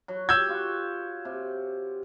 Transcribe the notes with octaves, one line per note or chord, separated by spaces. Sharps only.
F#3
G4 E6 G6 G#6
F4 F#4
C3